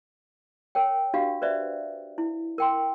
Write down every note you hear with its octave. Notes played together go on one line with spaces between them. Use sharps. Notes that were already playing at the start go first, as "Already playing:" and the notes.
A#4 C#5 G5
D4 F#4 G4 F5
B4 C5 D5 E5
E4
A#4 G5 C6